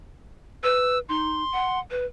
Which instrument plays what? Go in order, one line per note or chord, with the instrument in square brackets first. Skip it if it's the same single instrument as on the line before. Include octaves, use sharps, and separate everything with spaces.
[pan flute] B4 [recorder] E6
[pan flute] D#4 [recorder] C6
[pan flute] F#5
B4